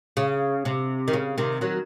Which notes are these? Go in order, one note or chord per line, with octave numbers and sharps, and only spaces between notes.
C#3
C3
D#3
C#3
C3 D#3
D#3 F#3